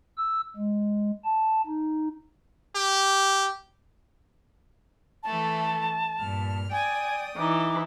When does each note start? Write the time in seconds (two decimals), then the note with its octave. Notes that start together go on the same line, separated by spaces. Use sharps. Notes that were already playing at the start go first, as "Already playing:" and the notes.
0.18 E6
0.56 G#3
1.24 A5
1.66 D#4
2.75 G4
5.23 E3 A3 A4 A5
6.19 G2 A#2 F6
6.71 D5 G5 G#5 D#6
7.38 E3 D#4 D6